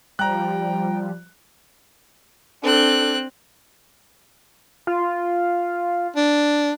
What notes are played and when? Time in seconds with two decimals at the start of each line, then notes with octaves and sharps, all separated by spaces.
0.19 F3 G3 G5 A#5 F#6
2.63 C4 D4 A4 F#6
4.87 F4
6.16 D4